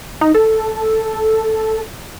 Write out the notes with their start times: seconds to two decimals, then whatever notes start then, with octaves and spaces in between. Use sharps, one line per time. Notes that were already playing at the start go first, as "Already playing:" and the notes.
0.21 D#4
0.34 A4